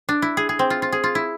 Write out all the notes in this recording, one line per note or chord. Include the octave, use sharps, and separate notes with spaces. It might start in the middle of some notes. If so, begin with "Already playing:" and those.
D4
E4
G#4
G#4
C4
F4
F4
G#4
F4
E4